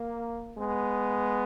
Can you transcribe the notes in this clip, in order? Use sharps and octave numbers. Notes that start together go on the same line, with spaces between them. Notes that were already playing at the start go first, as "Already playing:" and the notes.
Already playing: A#3
G#3 B3